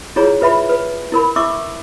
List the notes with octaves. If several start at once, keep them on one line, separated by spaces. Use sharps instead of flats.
E4 F4 G#4 C#5 A#5
F4 B4 E5 B5
B4
E4 A#4 B5
E4 E5 C#6 D6 E6